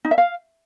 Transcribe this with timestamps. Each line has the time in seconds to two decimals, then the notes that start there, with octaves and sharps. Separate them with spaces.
0.05 D#4
0.11 E5
0.18 F5